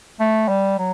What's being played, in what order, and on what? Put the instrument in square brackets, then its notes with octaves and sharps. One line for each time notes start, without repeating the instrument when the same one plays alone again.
[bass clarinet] A3
G3
F#3